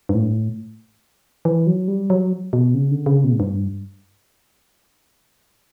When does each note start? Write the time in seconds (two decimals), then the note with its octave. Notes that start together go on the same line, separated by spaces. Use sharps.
0.09 G2
0.15 A2
1.45 E3
1.67 F#3
1.88 G3
2.10 F#3
2.53 B2
2.74 C#3
2.91 D3
3.06 C#3
3.24 B2
3.32 A2
3.40 G2